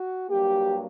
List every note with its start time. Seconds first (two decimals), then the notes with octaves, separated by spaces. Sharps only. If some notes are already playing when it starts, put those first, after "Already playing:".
Already playing: F#4
0.30 G2 F#3 A#3 G4